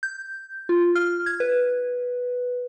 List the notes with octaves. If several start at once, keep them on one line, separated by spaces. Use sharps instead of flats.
G6
F4
F6
G#6
B4